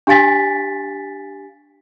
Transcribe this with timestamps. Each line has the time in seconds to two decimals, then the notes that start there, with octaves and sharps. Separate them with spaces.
0.07 D4 G4 F5 G#5 A6 B6